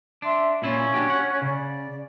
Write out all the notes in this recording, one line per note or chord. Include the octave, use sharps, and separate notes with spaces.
D4 E5 C6
A#2 C#4 E4 F4
D4 F#4 G4
F#5
C#3 D5